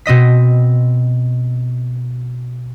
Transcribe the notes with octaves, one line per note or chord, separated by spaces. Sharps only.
B2 C4 D#5 B6